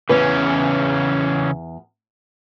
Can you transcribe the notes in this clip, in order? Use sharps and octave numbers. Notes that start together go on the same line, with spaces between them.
E2 C#3 E3 C#4 B4